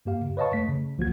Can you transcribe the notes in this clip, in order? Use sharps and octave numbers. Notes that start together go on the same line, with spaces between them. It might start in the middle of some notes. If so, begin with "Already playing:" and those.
G2 A#3 G4 F5
C#3
B4 C#5 D#5 F5 A5 C#6
A3 B6
C#3
C2 F3 A#3 F#4 G#6